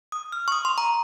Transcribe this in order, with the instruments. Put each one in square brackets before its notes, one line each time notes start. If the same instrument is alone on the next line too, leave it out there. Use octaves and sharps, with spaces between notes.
[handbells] D#6
F6
C#6
D#6
C6
A#5